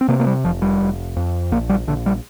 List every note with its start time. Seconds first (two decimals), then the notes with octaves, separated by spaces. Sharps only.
0.01 C4
0.08 C3 A#3
0.20 A#3
0.27 G3
0.44 F1 F3
0.62 G3
0.81 F1
1.16 F2
1.52 A#1 A#3
1.69 G3
1.87 A#1 D3
2.06 G3